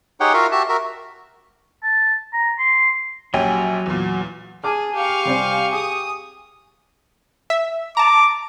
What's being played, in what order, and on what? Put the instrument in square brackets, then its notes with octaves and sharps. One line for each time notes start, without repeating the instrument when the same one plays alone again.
[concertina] D#4 G4 G#4 C#5 F#5 G5
F4 F#4 A#4 E5 F5
F#4 G4 E5 A5
F#4 A#4 E5
[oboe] A5
A#5
C6
[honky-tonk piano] A#1 C#4 G4 [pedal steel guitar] F#3 G#5
[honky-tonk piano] E2 A#2
[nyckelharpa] G#4 [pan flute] G#5 [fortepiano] A5 D6 F6
[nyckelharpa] G4 C#6 [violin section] F5
[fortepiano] C3 G3 C4
[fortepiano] G#4 [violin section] D#6
[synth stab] E5
[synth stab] A5 A#5 [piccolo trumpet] D6